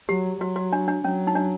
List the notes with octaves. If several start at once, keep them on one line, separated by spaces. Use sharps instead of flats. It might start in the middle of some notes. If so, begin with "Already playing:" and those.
F#3 G4
F#3 F#4
F#4
D4
D4
F#3 C#4
D#4
D4